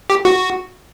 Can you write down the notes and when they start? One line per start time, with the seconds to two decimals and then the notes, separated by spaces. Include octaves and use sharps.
0.10 G4
0.25 F#4